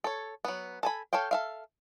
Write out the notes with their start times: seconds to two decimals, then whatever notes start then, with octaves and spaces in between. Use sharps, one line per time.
0.04 A4 C#5
0.45 F#3 B3
0.83 A4 G#5 B5
1.13 A4 C#5 F5 G5
1.31 A4 E5 F5